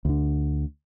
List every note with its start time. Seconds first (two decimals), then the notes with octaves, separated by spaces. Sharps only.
0.05 D2 D3